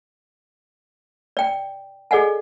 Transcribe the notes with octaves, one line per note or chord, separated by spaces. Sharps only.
D5 G5
G#4 A4 D5 D#5 F#5 G#5